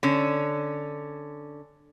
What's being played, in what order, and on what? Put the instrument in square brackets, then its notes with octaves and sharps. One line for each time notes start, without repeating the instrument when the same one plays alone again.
[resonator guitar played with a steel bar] D3 C#4